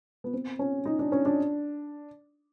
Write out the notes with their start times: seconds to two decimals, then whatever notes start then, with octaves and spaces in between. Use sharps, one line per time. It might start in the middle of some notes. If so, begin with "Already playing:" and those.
0.24 B3
0.34 C4
0.59 C#4
0.86 D#4
0.99 D4
1.12 C#4
1.25 D4